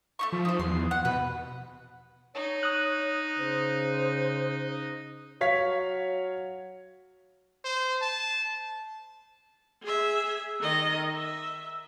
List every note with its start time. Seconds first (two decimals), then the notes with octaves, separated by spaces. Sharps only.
0.19 A3 D#4 C#6
0.32 F3
0.45 D#4 C5
0.59 E2 C6
0.91 F#5
1.05 B2 B4
2.35 D#4 C#5
2.63 D#6 F#6
3.38 C#3 C5
5.41 F#3 C#5 F5 B6
7.64 C5
8.02 A5
9.82 G#4 E5
10.61 D#3 D#5
11.14 E5